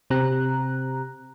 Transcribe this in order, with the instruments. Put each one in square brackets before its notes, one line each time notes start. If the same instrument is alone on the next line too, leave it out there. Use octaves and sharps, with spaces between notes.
[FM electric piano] C3 C4 G4 A#5 F#6